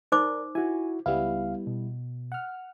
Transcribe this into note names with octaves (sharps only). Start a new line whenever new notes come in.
D#4 A#4 C5 D5 D6
E4 F#4 G#5
C#2 G3 B3 E4 F5
B2
F#5 F6